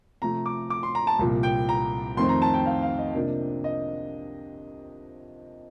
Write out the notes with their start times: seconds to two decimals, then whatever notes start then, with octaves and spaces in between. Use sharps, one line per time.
0.22 C3 F3 A3 A#5
0.46 D6
0.70 D6
0.83 C6
0.95 A#5
1.07 A5
1.19 C2 A#2 F3
1.43 G5
1.69 A#5
2.17 F2 D#3 A3 C4 C6
2.29 A#5
2.42 A5
2.54 G5
2.66 F5
2.82 F5
2.99 D#5
3.15 C3 F3 A#3 D4
3.64 D#5